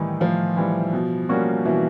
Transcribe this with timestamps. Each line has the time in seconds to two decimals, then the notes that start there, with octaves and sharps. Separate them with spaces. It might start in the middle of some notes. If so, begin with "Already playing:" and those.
Already playing: A2 D#3 E3 G3 D#4
0.21 A2 F3 F4
0.57 E3 G3
0.93 B2
1.29 G3 A#3 C#4 F#4
1.65 B2 E3 E4